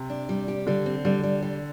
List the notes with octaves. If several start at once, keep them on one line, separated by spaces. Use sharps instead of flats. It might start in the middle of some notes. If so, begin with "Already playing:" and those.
Already playing: C3
D4
G3
G4
D3 G3
C4
D3 G3
G3
G3